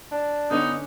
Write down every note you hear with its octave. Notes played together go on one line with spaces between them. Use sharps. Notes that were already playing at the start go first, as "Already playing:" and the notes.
D4
D3 B3 C#4 D#4